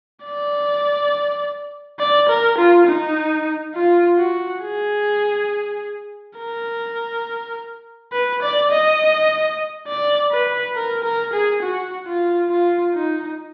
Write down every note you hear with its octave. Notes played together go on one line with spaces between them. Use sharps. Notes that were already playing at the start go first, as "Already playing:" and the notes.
D5
D5
A#4
F4
D#4
F4
F#4
G#4
A#4
B4
D5
D#5
D5
B4
A#4
A#4
G#4
F#4
F4
F4
D#4